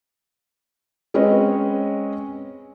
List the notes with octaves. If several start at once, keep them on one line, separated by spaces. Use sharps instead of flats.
G#3 C4 C#4 B4 C#5 D#5